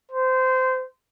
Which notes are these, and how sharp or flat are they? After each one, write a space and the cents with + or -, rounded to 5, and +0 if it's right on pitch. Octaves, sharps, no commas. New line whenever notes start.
C5 -20